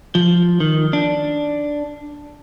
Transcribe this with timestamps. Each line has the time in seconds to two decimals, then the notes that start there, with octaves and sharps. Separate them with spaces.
0.15 F3
0.60 D#3
0.93 D4